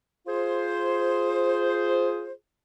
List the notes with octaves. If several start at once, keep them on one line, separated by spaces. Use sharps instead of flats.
F4 G#4 C5